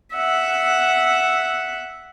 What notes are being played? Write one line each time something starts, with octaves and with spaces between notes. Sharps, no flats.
E5 F#5